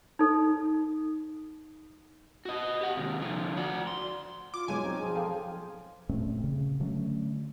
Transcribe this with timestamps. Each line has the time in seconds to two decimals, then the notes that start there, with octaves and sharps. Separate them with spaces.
0.19 D#4 A4
2.45 F#4 D#5
2.81 G4 F#5
2.97 D#2 C3
3.20 D3 F3
3.57 F#4 D5
3.87 C6
4.54 F4 D6
4.68 B1 G#3 F4 C#5 G#5 D#7
4.82 C4 D#4
5.00 F3 G#4
5.15 A4 F5 G5
6.09 A#2 A3 C4 C#4
6.44 C#3
6.80 D3 F#3 A3 C#4